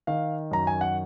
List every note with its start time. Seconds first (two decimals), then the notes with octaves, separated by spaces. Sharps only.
0.07 D#3 F5
0.51 F#2 A#5
0.67 G#5
0.81 F#5